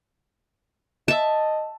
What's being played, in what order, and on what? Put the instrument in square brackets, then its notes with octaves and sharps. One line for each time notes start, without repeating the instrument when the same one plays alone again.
[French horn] D#5 [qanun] E5 A5